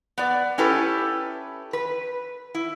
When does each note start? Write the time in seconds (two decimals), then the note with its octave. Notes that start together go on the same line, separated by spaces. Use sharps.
0.18 B3 D5
0.58 C#4 E4 G4 A4 B4
1.73 B4
2.55 E4